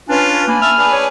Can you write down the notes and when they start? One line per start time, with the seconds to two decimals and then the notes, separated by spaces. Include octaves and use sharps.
0.09 C#4 D4 F4 B4 G#5
0.48 A#3 G#5 B5
0.61 E5 A5 F6
0.78 D4 G#4 B4
0.92 C#5